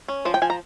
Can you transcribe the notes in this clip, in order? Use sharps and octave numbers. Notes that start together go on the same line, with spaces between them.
C#4
F3 C5
G5
F3 G#5
A#5